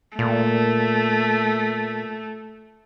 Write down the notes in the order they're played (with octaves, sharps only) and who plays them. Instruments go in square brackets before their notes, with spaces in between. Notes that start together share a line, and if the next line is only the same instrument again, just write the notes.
[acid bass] A#2 [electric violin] A3